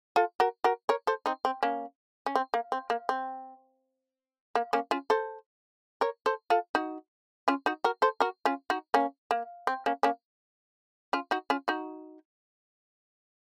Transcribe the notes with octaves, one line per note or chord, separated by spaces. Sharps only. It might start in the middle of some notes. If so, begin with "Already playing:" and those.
F4 A4
F#4 A#4
F#4 A#4
A#4 C#5
A4 C5
C4 D#4
C4
A#3 C#4
C#4
C4
A#3
C4
A#3
C4
A#3
A#3 C#4
C#4 F4
A4 C5
A#4 C#5
A4 C5
F4 A4
D#4 F#4
C#4 F4
D#4 F#4
F#4 A#4
A4 C5
F#4 A#4
C#4 F4
D#4 F#4
A#3 C#4
A#3
C4
A#3 C#4
A#3 C#4
C#4 F4
D#4 F#4
C#4 F4
D#4 F#4